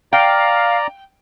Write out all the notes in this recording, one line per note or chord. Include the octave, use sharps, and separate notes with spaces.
D5 F5 G5 A#5